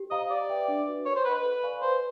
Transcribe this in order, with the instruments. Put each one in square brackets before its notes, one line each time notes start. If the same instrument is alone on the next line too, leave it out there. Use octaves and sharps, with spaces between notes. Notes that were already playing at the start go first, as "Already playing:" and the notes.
Already playing: [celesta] G4
[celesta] C5 F5 A#5 [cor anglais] D#5
[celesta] G4 [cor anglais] D5
[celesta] B4 E5 G5
D4
F#4 B4
[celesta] A#4 [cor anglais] C#5
[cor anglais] C5
[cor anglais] B4 [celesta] D#5 F#5 B5
[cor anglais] B4
[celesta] A4
D5 F5 G#5 C#6
[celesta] B4 [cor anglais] C5